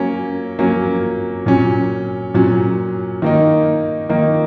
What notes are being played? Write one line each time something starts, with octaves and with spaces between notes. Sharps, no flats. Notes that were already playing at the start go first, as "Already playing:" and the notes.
Already playing: F#3 A#3 C#4
F#3 A#3 C#4
A#2 F#3 C#4
A#2 F#3 C#4
D#3 A#3 D#4
D#3 A#3 D#4